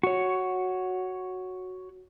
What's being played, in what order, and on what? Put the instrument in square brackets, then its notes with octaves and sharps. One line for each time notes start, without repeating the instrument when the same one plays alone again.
[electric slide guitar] F#4 C#5